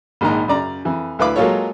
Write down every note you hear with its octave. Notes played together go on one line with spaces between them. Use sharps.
A#1 G#2 D#3 A#5
F#2 C#3 D5 A#5
F2 E3
D2 E4 B4 F5 B5 D6
F#3 G#3 A#3 F4 A4 C#5